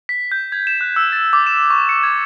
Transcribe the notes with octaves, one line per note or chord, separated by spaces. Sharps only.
B6
G6
G#6
E7
F#6
E6
A6
D6
E7
C#6
C#7
G#6